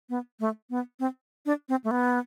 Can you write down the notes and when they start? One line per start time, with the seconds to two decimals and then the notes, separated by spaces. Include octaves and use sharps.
0.10 B3
0.40 A3
0.70 B3
1.00 C4
1.46 D4
1.69 C4
1.84 A3
1.91 B3